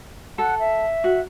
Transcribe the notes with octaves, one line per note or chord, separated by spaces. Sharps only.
A4 F#5
E5
F#4